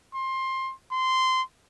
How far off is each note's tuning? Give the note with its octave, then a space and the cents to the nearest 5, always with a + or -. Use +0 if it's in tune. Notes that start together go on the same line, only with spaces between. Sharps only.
C6 +20
C6 -15